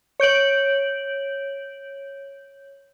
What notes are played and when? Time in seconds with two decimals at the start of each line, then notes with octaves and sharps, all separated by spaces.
0.20 C#5 G6 D7 F#7